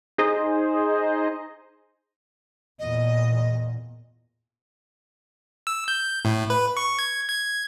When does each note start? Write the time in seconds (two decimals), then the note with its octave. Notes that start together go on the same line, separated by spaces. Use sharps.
0.18 D#4 G#4 C5 D#5
2.79 E2 A#2 D#5
5.67 E6
5.88 G6
6.25 A2
6.50 B4
6.77 C#6
6.99 G#6
7.29 G#6